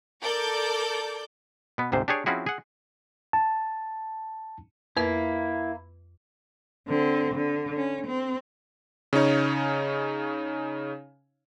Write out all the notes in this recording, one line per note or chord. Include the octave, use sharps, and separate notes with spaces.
A4 A#4 D5 D6 G6
B2 B3
D2 G#2 C3 C5
D4 G4 G#4 C#5
F3 C4 C#4 E4 F#4 G#4
G#4 F#5
A5
F2 A#3 E4 B4
D3 C4
D3
C#4
C4
C#3 C#4 D#4 C#5